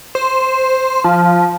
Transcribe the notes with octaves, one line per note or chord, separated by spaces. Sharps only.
C5
F3